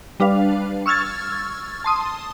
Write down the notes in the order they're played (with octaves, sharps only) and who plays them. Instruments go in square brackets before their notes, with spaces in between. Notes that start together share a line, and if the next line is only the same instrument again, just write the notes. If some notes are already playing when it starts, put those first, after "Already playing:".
[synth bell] G3 D4 B4 F5
C#6 E6 F6 G#6 A6
A5 C6 D#6